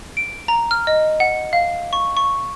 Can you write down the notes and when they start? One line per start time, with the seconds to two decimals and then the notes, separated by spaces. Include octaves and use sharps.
0.17 D7
0.48 A#5
0.71 F6
0.87 D#5
1.20 F#5
1.53 F5
1.93 C#6
2.17 C#6